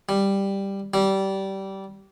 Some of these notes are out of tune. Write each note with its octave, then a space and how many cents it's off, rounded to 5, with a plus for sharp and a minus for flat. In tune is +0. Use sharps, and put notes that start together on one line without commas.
G3 +5
G3 -20